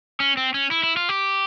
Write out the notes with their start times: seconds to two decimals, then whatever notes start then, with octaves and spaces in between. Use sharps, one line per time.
0.20 C#4
0.37 C4
0.54 C#4
0.71 E4
0.83 E4
0.97 F4
1.09 G4